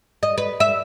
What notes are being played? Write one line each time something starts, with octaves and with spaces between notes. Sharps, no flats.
D#5
B4
E5